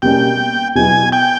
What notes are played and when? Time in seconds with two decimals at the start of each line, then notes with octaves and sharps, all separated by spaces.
0.02 B2 G3 A#3 C#4 G5
0.75 B2 F#3 B3 E4 G#5
1.12 G5